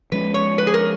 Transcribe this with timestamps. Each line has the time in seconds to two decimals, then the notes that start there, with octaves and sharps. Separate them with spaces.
0.12 F3 G#3 C#4 B4
0.34 C#5
0.58 B4
0.67 G#4
0.74 A#4